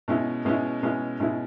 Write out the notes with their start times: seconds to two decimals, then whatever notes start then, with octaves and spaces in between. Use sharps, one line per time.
0.08 B2 G#3 C#4 E4
0.45 B2 G#3 C#4 E4
0.83 B2 G#3 C#4 E4
1.20 B2 G#3 C#4 E4